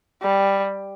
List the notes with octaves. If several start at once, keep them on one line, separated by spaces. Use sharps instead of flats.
G3